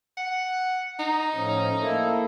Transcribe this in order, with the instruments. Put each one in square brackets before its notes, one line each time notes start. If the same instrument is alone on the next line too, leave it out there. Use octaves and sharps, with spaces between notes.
[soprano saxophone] F#5
D#4
[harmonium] A2 F3 C#4
A#3 E4 A4